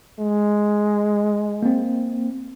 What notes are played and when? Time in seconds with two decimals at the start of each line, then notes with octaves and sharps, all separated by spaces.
0.20 G#3
1.62 A#3 C4